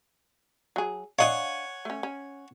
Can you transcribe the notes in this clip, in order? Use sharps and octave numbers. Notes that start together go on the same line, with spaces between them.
F#3 G#4
D4 C#5 D#5 F5 F#5 G#5
A3 C#4
C#4